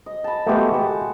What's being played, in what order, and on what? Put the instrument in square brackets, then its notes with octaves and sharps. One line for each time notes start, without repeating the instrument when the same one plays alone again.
[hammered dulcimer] D#5
A5 B5
[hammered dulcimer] G#3 F#4 [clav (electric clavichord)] A3 B3 G4
[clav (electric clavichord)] G4 [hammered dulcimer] A5